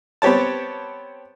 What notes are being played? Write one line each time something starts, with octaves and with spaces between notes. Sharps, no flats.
B3 C4 G4 C#5 A5